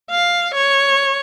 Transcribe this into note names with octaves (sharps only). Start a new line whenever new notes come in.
F5
C#5